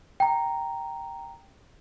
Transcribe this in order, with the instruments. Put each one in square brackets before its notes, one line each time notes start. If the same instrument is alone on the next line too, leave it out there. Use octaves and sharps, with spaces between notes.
[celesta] G5 A#5